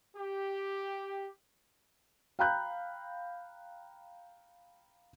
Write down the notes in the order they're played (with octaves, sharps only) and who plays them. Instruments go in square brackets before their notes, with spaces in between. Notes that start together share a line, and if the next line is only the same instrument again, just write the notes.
[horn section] G4
[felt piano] F5 G5 A#5 B5 F#6 G6